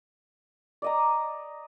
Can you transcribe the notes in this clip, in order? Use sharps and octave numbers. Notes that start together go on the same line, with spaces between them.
D5 D#5 A#5